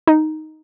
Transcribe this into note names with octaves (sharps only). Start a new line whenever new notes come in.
D#4